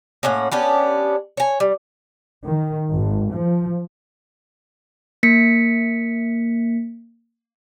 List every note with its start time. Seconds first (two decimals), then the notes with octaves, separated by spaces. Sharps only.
0.23 A2 A#3 C#4 F#5
0.52 B3 C#4 D4 G4
1.37 C#5 G#5
1.60 G3
2.47 D#3
2.93 G#1
3.31 F3
5.23 A#3 B6 C#7